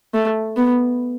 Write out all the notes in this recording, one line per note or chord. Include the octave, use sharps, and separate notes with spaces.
A3
B3